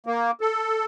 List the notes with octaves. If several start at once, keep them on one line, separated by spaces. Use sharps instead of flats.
A#3
A4